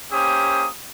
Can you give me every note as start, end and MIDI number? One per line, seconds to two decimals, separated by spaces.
0.11 0.67 58
0.11 0.67 61
0.11 0.67 67
0.11 0.67 72
0.11 0.67 87